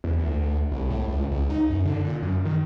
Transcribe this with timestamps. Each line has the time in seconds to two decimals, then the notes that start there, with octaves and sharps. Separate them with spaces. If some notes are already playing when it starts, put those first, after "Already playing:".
0.04 E2
0.19 D2
0.72 C2
0.90 A2
1.08 C#2
1.31 C#2
1.50 D#4
1.70 F#2
1.85 D3
2.05 A#2
2.22 F#2
2.45 D#3